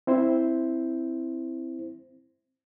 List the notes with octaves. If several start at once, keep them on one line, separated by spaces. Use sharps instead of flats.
C4 E4 C5